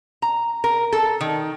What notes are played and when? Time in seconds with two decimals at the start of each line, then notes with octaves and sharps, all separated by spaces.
0.22 A#5
0.64 A#4
0.93 A4
1.21 D#3